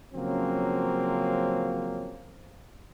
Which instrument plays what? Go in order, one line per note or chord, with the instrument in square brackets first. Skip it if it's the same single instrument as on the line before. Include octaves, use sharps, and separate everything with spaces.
[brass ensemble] C#3 F3 F#3 A#3 C4 C#4